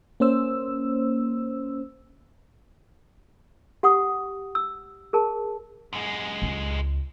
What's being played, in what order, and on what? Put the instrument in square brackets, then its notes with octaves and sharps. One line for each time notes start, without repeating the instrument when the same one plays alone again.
[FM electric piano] A#3 C#4 C5 E6
[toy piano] G4 F#5 C#6 D#6
E6
G#4 A#4 A5
[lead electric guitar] F#2 G#3
[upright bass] C#2